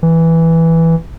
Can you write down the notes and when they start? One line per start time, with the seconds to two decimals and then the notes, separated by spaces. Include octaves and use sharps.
0.03 E3